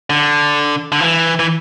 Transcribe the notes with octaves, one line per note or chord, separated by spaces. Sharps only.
D3
D3
E3
E3